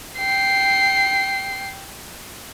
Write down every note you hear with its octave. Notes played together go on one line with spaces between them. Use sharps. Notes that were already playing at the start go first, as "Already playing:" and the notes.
G5 C7